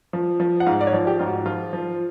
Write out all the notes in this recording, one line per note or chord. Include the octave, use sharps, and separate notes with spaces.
F3
F3
F#5
G#2 F5
D5
C#5
F3
G4
G#2 F4
F#4
F3 F4
F3